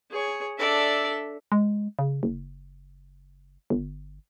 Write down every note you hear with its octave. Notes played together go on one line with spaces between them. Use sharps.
G#4 C#5
D4 A4 D5 E5
G#3
C#3
F#1
G1